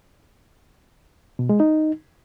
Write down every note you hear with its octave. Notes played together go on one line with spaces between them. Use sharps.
B2
G#3
D#4